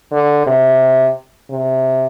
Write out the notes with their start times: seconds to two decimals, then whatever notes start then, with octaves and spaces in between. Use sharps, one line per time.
0.12 D3
0.46 C3
1.50 C3